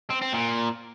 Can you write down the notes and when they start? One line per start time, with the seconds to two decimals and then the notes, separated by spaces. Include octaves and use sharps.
0.10 C4
0.22 C4
0.33 A#2